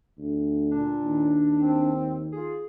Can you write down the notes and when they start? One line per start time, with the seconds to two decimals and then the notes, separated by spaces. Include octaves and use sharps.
0.19 D2
0.71 A#2 D4
1.03 D#2
1.59 C4
2.32 F4 G#4